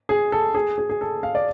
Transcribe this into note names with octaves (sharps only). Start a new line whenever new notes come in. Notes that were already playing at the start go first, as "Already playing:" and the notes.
G#4
A4
G#4
G#4
G#4
A4
F5
D5